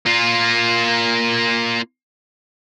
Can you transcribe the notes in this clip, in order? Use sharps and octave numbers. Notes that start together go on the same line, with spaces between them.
A#3 F4